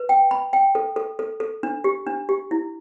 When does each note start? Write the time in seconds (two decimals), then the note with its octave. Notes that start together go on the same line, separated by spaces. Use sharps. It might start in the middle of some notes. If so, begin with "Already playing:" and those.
Already playing: B4
0.09 G5
0.31 B5
0.53 G5
0.75 A4
0.96 A4
1.19 A4
1.40 A4
1.63 D4
1.84 G4
2.07 D4
2.29 G4
2.51 E4